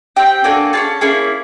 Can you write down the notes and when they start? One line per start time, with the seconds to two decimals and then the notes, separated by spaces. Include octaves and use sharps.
0.16 C4 D#4 G4 G5
0.44 A#3 D4 F#4 A4 G#5
0.73 C#4 F4 G#4 A5
1.01 A#3 C#4 E4 G#4